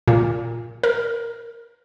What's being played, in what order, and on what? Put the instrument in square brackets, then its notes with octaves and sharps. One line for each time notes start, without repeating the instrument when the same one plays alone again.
[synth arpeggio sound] A#2
A#4